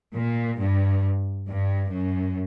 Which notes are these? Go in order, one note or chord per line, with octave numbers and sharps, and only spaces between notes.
A#2
G2
G2
F#2